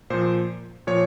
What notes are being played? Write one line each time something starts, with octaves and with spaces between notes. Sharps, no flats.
A#2 F3 C5
A#2 F3 C#5